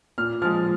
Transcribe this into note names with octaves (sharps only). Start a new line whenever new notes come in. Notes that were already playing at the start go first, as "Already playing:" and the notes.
A#2 F6
F3 G#3 F6